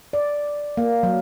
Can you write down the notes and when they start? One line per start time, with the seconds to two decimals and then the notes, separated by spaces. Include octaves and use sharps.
0.13 D5
0.77 A#3
1.03 F#3